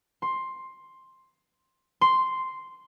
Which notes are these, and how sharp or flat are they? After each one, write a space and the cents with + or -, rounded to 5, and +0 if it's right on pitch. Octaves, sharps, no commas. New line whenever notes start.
C6 +10
C6 -5